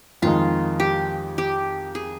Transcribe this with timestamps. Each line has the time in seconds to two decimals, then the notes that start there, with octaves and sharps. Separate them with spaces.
0.22 F2 D#3 G#3 D#4 F4
0.80 G4
1.38 G4
1.95 G#4